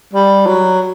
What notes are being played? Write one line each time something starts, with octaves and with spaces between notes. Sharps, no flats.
G3
F#3